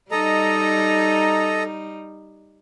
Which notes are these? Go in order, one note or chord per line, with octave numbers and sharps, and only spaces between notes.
G3 D#4 A4 D#5 A#5